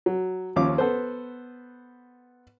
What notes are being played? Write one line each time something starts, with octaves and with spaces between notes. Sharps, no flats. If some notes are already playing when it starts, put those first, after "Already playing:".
F#3
D#2 F3 C#4 E5 F5 D6
B3 A4 B4 C5